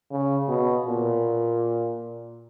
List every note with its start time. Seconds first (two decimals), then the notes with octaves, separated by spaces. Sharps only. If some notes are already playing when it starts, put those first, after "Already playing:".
0.11 C#3
0.48 B2
0.86 A#2